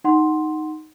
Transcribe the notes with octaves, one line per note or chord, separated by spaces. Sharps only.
D#4 F#5 C6